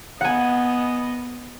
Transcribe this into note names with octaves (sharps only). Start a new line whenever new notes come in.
B3 D#5 F#5 G#5